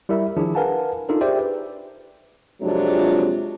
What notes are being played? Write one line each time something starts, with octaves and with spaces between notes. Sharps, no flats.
G3 E4 A#4 E5
D#3 F3 D4 E4 G#4
A#4 B4 F5 F#5 G#5 A5
D4 D#4 F4 A4 A#4
G4 G#4 C5 D5 E5 G5
B4
F2 C3 F3 F#3 G#3 D4